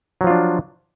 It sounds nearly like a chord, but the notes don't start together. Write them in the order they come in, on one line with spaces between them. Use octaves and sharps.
F#3 F3 F4 D4